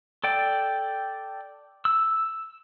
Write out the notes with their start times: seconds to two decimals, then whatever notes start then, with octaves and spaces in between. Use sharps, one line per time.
0.24 A4 D5 G5
1.85 E6